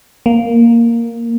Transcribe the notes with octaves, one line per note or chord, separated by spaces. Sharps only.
A#3